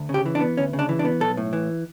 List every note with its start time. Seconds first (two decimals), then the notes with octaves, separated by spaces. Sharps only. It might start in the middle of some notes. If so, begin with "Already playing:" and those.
Already playing: D2
0.09 C#3
0.14 G4
0.26 E3
0.35 D4
0.40 B3
0.57 D2 C#4
0.73 C#3
0.79 D4
0.89 E3
0.99 D4
1.05 B3
1.20 B1 A4
1.37 A2
1.53 E3